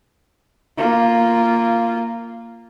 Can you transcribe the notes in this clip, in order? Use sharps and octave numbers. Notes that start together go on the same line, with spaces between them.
A#3 F4